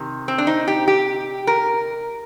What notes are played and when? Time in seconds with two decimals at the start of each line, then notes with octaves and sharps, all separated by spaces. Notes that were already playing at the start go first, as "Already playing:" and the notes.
Already playing: C3 D#3
0.28 C4
0.38 D4
0.47 D#4
0.68 G4
0.88 G4
1.47 A#4